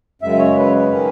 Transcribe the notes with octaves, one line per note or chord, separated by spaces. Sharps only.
F#2 C#3 G#3 E5
C#5
B4
D#3 A#3 C#4